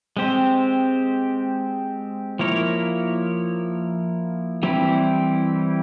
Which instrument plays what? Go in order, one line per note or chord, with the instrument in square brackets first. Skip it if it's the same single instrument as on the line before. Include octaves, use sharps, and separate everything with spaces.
[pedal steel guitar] G#3 C4 G4 C5
F3 A#3 E4 A#4 C#5
E3 G3 C4 E4 G4